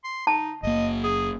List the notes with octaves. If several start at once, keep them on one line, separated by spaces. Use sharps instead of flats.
C6
D#4 A5
F#1 A#3 D#5
G#4